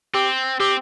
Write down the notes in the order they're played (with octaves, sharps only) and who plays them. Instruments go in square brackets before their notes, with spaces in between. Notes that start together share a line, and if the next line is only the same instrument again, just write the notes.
[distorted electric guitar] C4 [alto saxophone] G4
[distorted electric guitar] C4 [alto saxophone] G4